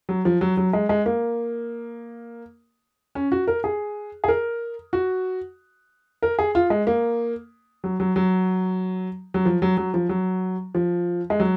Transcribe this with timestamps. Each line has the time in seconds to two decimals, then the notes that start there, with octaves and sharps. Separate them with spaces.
0.09 F#3
0.25 F3
0.41 F#3
0.57 F#3
0.73 G#3
0.89 G#3
1.06 A#3
3.15 C#4
3.32 F#4
3.48 A#4
3.64 G#4
4.24 G#4
4.28 A#4
4.93 F#4
6.23 A#4
6.39 G#4
6.55 F4
6.70 G#3
6.87 A#3
7.84 F#3
8.00 F#3
8.16 F#3
9.34 F#3
9.46 F3
9.62 F#3
9.77 F#3
9.94 F3
10.09 F#3
10.75 F3
11.30 G#3
11.40 F#3